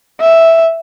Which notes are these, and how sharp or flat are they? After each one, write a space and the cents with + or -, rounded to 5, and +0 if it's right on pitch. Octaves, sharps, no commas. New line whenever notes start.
E5 +0